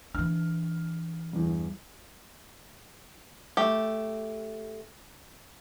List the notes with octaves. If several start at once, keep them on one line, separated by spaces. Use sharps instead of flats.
E3 D4 F6
E2 G2
A3 G4